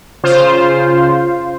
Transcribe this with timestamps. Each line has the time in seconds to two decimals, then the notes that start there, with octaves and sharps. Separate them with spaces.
0.23 C#3 F4 C5